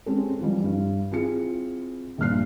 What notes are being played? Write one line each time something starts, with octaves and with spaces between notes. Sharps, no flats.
G#3 C4 C#4 G#4 A4
E3 F3 G3
G2
C4 E4 F4 G#4 C#7
A#1 G2 A#2 F6 F#6 C7